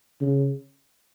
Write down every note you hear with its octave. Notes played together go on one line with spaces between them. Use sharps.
C#3